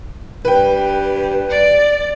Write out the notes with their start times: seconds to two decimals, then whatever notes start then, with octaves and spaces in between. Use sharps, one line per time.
0.45 G2 B4 G5
1.50 D5